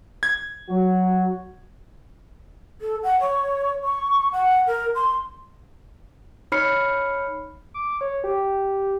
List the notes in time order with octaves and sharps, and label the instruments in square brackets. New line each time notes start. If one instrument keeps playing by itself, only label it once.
[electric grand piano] G#6
[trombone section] F#3 F#4
[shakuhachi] A4
F#5
C#5
C#6
F#5
A#4
C6
[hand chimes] D#4 C#5 B5 F6 C7 C#7
[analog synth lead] D6
C#5
G4